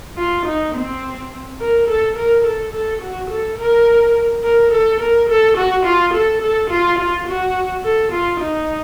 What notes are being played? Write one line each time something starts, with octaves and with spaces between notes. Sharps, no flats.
F4
D#4
C4
A#4
A4
A#4
A4
A4
F#4
A4
A#4
A#4
A4
A#4
A4
F#4
F4
A4
A4
F4
F4
F#4
A4
F4
D#4